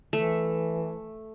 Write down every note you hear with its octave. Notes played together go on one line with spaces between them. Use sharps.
E3 A3